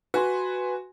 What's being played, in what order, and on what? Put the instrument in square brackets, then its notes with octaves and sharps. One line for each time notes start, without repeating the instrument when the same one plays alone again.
[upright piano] F#4 [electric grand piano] B4 G#5 C6